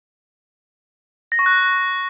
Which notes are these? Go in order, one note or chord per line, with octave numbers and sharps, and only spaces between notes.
A#6
C#6
F#6